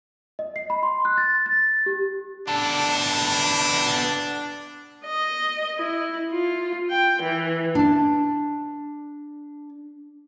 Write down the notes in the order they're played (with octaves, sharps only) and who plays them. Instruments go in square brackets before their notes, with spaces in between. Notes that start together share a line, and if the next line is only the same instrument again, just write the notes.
[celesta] D#5
C7
B5
C6
F#6
A6
A6
G4
[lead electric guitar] B3 A4 [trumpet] D4
[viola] D#5
E4
F4
G5
E3
[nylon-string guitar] D4 A5